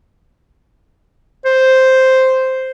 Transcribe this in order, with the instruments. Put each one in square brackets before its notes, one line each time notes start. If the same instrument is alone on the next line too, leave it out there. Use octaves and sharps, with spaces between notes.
[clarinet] C5